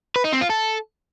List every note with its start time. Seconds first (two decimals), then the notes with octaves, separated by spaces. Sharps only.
0.16 B4
0.24 D#4
0.33 C4
0.41 F4
0.49 A4